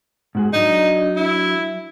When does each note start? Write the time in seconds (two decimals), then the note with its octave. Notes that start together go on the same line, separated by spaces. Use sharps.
0.35 G#2 F#4 G#4
0.53 F#3 D4 D#4
1.16 E4